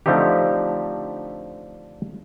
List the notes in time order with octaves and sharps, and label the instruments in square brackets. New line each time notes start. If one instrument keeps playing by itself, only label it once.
[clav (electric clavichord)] D3 F3 A3 C4 D#4 G4